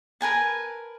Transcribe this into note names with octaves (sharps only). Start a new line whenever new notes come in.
A#4 B4 G#5 A5